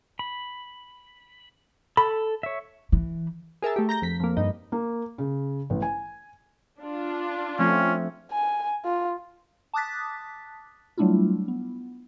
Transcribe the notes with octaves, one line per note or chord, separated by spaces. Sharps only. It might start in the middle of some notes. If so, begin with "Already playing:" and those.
B5
A4 B5
C#5 E5
E3
G#4 A#4 E5 A5
A3 G4
A#5 G6 A#6
F2 B6
F2 A#3
G2 D#4
A#3
C#3
A1
G#5
D4 F4
F3 A3 C4 C#4
G#5
F4
A5 D6 D#6 F#6 A6 B6
F#3 G3 A3 D4 E4 F4
B3